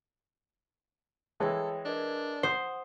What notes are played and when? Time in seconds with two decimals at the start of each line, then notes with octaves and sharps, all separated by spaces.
1.40 E3 G#3 G#4 A4 C#5 G5
1.85 D4 A#4 B4 D#5
2.43 C5 F#5 D#6